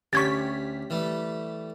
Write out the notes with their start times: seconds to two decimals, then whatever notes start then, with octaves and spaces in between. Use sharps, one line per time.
0.13 D2 C#4 G4 C#6 G#6 A6 B6
0.90 E3 G3 A3